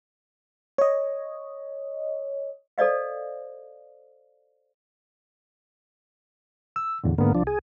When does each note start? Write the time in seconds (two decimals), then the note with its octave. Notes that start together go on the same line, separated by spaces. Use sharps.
0.78 C#5 D#5
2.78 A4 C5 D5 D#5 F5
6.76 E6
7.04 E2 A2 D3
7.18 G#2 D3 A#3 B3
7.35 C2 F3 D4
7.47 G#4